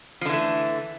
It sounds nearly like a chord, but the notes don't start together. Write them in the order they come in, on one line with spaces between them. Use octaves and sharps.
F3 D3 E3 A3